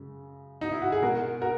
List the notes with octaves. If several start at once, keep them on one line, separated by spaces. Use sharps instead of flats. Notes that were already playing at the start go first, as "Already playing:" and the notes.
Already playing: F#2 C#3 G#3
D#4
E4
F#4
G#4
B2 G#3 F#4 A#4
F#4 A#4